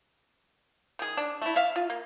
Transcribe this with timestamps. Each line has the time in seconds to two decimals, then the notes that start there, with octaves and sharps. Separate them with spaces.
0.99 D#3 G#4
1.17 D4
1.42 A3 E4
1.56 E5 F5
1.76 F4
1.90 A#3